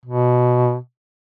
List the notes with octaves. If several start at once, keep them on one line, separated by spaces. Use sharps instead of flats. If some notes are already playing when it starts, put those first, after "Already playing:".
B2